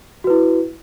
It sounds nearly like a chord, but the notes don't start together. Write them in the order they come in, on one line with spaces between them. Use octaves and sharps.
F#4 B4 E4